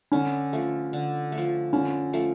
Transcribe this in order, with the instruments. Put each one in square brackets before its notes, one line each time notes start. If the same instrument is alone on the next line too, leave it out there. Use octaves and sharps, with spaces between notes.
[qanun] D3 [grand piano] C#4
[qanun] F3 A3
D3
A3
F3
[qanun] D3 [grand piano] C#4
[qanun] F3 A3